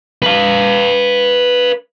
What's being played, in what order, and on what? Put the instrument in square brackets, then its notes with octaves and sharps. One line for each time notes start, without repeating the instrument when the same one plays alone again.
[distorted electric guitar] B4 F5